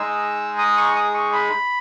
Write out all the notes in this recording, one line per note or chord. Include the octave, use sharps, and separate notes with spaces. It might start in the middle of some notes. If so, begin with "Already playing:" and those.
Already playing: G#3 D#4 G#4 E6
D#6
C#6
D#6
C#6
B5